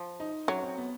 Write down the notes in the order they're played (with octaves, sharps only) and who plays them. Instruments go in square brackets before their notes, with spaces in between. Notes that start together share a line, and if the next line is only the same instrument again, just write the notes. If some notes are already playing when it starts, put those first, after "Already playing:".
Already playing: [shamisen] F3
[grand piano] D#4
[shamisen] F#3 [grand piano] C#4
[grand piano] C4
B3